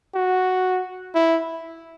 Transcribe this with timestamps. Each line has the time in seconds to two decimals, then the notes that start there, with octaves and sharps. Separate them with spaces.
0.14 F#4
1.15 E4